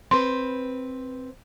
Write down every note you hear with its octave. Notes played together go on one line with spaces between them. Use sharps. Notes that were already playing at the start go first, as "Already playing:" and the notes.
C4 B4 C6